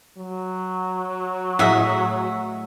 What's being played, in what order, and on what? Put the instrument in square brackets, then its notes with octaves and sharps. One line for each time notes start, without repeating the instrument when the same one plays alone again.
[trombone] F#3
[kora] A2 G#4 D#5 [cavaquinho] E5 F#5